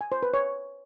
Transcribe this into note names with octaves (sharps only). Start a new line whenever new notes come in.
G#5
C5
B4
C#5